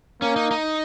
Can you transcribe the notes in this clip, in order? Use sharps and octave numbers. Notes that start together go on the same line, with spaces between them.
A#3 C#4
D#4
D#4